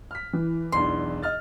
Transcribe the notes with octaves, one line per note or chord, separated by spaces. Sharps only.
F6 B6
E3
B1 E2 D4 C6
D#5 F6 A6